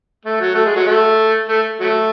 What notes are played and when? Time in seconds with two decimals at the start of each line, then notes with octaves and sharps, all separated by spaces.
0.25 A3
0.40 F#3
0.55 A3
0.65 G#3
0.76 F#3
0.86 A3
1.48 A3
1.80 F#3 A3